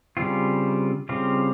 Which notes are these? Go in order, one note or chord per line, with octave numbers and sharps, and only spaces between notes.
C#3 G3 C4 F4
C#3 G3 C4 F4